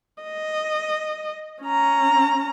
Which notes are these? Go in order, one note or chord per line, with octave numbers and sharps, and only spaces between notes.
D#5
C#4 A#5